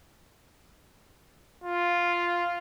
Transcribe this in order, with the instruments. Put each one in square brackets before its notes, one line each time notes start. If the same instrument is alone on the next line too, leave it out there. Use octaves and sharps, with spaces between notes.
[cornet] F4